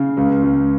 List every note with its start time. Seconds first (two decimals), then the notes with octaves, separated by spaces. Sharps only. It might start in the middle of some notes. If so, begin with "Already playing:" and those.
Already playing: C#3
0.17 C#2
0.43 C#2